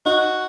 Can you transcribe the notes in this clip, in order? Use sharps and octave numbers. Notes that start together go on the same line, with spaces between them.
D#4 F#4